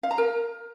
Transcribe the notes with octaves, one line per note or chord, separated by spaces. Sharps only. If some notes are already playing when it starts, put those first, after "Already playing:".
F5
A#5
A#4